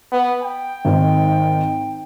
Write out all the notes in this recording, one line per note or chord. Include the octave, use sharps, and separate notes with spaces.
B3
G5
G#1 D#3